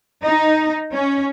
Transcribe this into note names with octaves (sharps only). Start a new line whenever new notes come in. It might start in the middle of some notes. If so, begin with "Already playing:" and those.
D#4
C#4